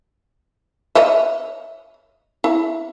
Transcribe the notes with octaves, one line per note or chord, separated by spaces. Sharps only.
C#5 D#5 E5
E4